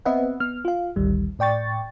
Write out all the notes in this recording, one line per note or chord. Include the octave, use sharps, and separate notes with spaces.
B3 C4 B4 D#5 E5 F#5
B3 F6
F4 F5
G#1 D2 D#3 G3
A2 D5 G5 C#6 A6